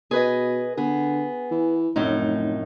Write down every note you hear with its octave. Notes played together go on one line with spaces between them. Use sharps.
B2 G#4 B4 D#5
D3 B3 G#4
E3
F1 F#2 A2 D#4